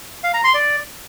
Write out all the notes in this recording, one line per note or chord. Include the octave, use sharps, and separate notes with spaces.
F5
A#5
C6
D5